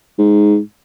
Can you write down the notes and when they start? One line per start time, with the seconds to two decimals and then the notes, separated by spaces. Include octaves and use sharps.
0.18 G#2